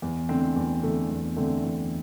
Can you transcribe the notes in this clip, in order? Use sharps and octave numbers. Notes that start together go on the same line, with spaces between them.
E2
D3 A3 C4
E2
D3 A3 C4
E2
D3 A3 C4
E2